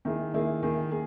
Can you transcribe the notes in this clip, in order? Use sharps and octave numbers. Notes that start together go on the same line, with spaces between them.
D#3 A#3 E4 G#4
D#3 A#3 E4 G#4
D#3 A#3 E4 G#4
A#3 G#4